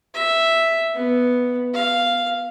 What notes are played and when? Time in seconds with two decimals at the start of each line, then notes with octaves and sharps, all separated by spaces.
0.14 E5
0.94 B3
1.74 F5